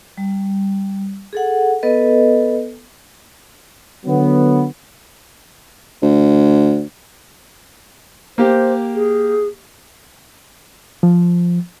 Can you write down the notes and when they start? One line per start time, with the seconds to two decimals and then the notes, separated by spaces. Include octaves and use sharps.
0.18 G3
1.33 G#4 A4 F#5
1.83 B3 A4 B4 D#5
4.06 D3 F#3 B3
6.02 D2
8.38 A#3 G4 C5
8.94 G#4
11.03 F3